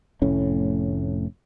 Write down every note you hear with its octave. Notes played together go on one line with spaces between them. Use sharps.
F1 A2 C#4